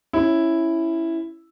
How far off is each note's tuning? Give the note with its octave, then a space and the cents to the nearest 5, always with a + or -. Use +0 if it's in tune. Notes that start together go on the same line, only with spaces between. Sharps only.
C#4 -10 E4 +0